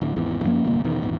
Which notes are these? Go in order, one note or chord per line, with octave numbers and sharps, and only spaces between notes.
D1
G#1 E2 E3
F#2 F3 A#3 C#4
D1 G1 C2 A#3
E2 B2 D#3
D#1 G#1 E2